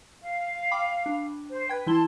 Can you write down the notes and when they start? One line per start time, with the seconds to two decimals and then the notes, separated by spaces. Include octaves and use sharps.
0.22 F5
0.71 G5 B5 D6
1.06 D4
1.50 C5
1.69 B4 G5 G#6
1.87 E3 E4 A5 C6 G7